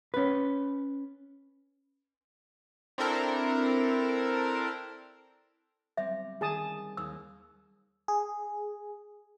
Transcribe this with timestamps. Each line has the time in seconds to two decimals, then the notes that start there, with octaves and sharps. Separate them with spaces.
0.14 C#4 B4
2.98 C4 D4 E4 A4 A#4
5.97 G3 C4 E5
6.41 D#3 G#4 A5 D#6
6.97 D#2 E6
8.08 G#4